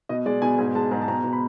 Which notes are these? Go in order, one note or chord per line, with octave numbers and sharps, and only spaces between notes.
B2 D#5
G#3 D5
B2 G#5
G#2 G#5
G#3 A5
G#2 A#5
A5
B2 A#5
B2
B5